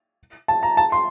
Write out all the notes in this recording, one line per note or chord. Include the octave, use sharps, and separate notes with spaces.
A5
A#5
A5
C6